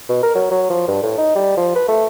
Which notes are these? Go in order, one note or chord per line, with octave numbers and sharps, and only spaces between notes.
B2
A#4
F#3
F#3
F3
G2
A2
D#4
G3
F3
B4
A3